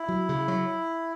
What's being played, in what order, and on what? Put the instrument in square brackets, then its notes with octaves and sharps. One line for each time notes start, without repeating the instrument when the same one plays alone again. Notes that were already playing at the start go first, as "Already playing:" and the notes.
Already playing: [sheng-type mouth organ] E4
[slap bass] F#3
C#3
F#3